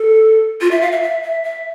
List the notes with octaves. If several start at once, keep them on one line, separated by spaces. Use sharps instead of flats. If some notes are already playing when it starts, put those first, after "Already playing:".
Already playing: A4
F4
E5
F5
E5
E5
E5
E5